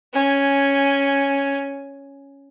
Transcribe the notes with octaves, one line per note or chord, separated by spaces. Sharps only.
C#4 G#5